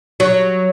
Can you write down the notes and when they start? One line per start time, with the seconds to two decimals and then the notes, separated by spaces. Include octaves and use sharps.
0.20 F#3